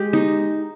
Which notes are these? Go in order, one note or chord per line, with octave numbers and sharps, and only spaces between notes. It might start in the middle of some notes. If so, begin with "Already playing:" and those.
Already playing: G#3 G4
D#4